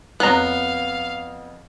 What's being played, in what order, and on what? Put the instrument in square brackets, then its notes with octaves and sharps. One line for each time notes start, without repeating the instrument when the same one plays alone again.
[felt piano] F2 C#5 [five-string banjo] B3 [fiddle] F5 [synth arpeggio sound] A#5 F#6